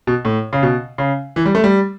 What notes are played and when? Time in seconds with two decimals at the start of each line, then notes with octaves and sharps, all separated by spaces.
0.07 B2
0.25 A2
0.53 C#3
0.63 B2
0.98 C#3
1.36 E3
1.46 G3
1.55 A3
1.64 G3